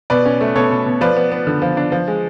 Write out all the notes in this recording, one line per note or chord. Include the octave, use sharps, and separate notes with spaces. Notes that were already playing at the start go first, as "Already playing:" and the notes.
B2 B4 D5
C#4
A3
B2 A4 C#5
B2
B2
F3 B4 D5
B3
B3
D3
F3
D4
F3
G#3